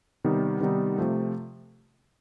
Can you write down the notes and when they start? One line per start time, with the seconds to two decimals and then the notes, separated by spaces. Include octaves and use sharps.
0.24 C3 D#3 G3 B3 D#4
0.61 C3 D#3 G3 B3 D#4
0.98 C3 F3 A3